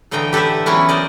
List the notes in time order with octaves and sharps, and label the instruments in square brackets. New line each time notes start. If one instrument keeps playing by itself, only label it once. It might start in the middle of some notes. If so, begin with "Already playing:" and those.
[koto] A2 D3 E3 D#5 G5 A#5
G4 A4 B4 C5 E5
E3 F#3 B3 C#4 E4
A#4 C5 D5 D#5